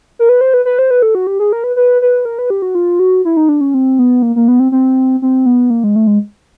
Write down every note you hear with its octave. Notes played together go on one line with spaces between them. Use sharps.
A#4
B4
C5
B4
B4
C5
B4
A4
F#4
G4
G#4
A#4
B4
B4
B4
A#4
B4
G4
F#4
F4
F#4
E4
D#4
D4
C#4
C4
B3
A#3
A#3
B3
C4
C4
C4
B3
A#3
G#3
A3
G#3